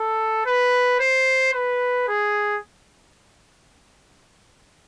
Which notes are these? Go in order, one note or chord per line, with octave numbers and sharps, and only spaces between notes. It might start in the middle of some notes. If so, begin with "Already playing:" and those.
Already playing: A4
B4
C5
B4
G#4